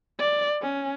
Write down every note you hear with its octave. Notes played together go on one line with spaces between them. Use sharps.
D5
C#4